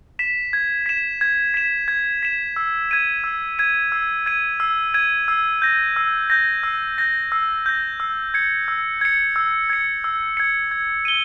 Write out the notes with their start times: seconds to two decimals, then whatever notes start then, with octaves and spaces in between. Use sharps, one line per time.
0.19 B6 E7
0.53 G#6
0.86 B6 E7
1.21 G#6
1.54 B6 E7
1.88 G#6
2.23 B6 E7
2.56 E6
2.91 G#6 D#7
3.24 E6
3.59 G#6 D#7
3.92 E6
4.26 G#6 D#7
4.60 E6
4.94 G#6 D#7
5.28 E6
5.62 G6 A#6
5.96 E6
6.30 G6 A#6
6.63 E6
6.98 G6 A#6
7.32 E6
7.66 G6 A#6
8.00 E6
8.34 G#6 C#7
8.68 E6
9.01 G#6 C#7
9.36 E6
9.70 G#6 C#7
10.04 E6
10.37 G#6 C#7
10.71 G#6
11.05 D#7 G7